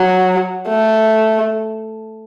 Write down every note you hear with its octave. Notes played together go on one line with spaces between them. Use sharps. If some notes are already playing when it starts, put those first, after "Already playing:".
Already playing: F#3
A3